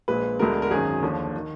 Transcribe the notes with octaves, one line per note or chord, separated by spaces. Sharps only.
A#1 A#2 G#3 B4
D2 D3 G#3 B3 A#4
A#4
G#1 F#2 D#3 G#4
D#2 D3 F3
D#3